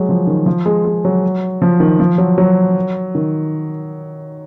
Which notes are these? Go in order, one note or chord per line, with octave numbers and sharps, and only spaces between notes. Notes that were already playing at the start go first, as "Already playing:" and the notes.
Already playing: F#3 G#3
F3
D#3
F3
G#3
G#3
F#3
F3
D#3
F3
F#3
F#3
D#3